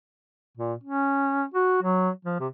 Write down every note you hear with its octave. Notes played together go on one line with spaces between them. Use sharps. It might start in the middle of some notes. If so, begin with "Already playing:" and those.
A#2
C#4
F#4
F#3
F3
C3